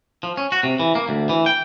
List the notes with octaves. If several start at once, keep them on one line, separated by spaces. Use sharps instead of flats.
F3
C#4
F#4
C3
E3
A#3
D2
E3
G5